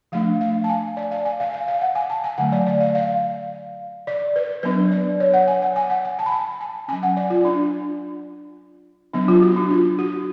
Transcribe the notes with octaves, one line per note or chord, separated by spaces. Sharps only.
F3 A3 D4 F5
F5
A5
G#5
D5
F5
G#5
F5
F5
F5
F#5
G#5
A5
G#5
D3 F#3 A3 F#5
D5
D5
F5
F5
D5
B4
F#3 B3 D4 B4
D5
C#5
F#5
G#5
F#5
G#5
F#5
G#5
A5
B5
A5
G#5
F#3 C#4 G#5
F#5
D5
F4
D4
F#3 B3 D4
F4
F#4
D4
F4
F#4